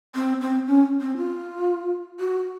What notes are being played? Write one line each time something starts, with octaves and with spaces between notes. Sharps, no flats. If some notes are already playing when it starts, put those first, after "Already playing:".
C4
C4
C#4
C4
F4
F#4